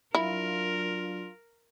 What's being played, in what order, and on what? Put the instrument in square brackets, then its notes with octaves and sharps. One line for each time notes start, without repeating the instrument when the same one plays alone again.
[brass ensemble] F#3 D4 F4 [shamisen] E4 [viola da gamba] A#4